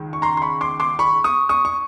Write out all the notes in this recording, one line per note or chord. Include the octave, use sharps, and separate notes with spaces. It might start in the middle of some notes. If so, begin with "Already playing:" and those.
Already playing: C#2 D#3
C#6
A#5 C6
C6
B5 C#6
C6 D6
C6 D6
B5 C#6
C#6 D#6
C#6 D#6
C#6